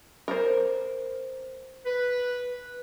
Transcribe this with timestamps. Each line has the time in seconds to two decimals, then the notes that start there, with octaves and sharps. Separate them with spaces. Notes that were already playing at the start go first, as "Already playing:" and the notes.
0.28 A#4 C5
1.86 B4